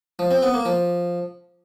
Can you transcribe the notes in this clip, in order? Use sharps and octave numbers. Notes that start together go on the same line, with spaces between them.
F3
C4
B3
A#3
F3